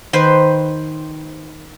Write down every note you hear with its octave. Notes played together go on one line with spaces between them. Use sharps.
D#3 B4 C5